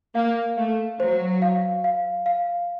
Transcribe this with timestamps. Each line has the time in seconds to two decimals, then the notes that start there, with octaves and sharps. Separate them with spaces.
0.15 A#3 F5
0.57 A3 F5
1.00 F#3 C5
1.42 F5
1.84 F5
2.26 F5